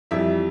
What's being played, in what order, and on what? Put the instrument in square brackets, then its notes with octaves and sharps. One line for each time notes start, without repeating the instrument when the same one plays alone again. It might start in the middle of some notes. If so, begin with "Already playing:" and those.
[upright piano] F2 E3 G3 E5